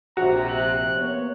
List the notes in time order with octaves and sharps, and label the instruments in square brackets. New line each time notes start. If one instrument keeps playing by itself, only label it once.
[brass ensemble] A#1 C3 [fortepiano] F#4 [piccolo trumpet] A#5
[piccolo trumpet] F#6
[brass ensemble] A#3 B3 C#5